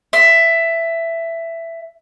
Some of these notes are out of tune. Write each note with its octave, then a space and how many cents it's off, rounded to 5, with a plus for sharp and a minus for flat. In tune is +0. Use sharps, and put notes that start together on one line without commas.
E5 +10 C6 +0